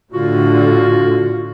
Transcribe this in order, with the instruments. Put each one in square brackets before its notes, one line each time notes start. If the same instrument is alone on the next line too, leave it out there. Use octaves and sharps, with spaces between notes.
[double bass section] A2 D3 [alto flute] F4 [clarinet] F#4